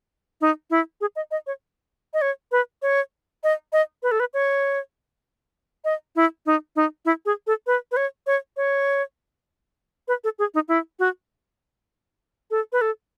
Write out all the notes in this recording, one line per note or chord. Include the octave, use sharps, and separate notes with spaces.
D#4
E4
G#4
D#5
D#5
C#5
D#5
C#5
B4
C#5
D#5
D#5
B4
A4
B4
C#5
D#5
E4
D#4
D#4
E4
G#4
A4
B4
B4
C#5
C#5
C#5
B4
A4
G#4
D#4
E4
F#4
A4
B4
A4